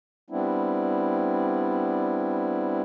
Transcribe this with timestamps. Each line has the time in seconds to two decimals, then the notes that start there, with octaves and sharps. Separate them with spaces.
0.30 G3 B3 C4 D4 E4